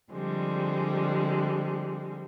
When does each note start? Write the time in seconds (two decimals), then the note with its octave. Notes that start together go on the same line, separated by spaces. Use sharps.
0.12 D3 F3 G3 G#3 C4